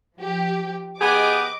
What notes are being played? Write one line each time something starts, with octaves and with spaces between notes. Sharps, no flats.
F3 G4
B3 G4 G#4 D#5 D6